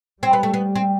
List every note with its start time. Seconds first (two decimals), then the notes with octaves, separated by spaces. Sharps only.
0.23 G3 C4
0.33 B3
0.43 A3
0.54 B3
0.75 C4